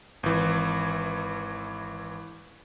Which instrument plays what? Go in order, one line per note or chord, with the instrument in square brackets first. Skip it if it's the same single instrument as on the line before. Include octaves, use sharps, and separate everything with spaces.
[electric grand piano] G#1 E3